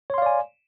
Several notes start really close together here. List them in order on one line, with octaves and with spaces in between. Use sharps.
C#5 C6 F5 D5 G#5